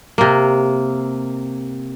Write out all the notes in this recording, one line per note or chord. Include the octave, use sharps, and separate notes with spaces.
C3 A#3